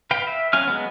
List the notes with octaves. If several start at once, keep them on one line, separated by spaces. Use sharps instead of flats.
B4 F5 G5
E5
F#3 C#4 F5 G#5 F6
F#3 G#3 B3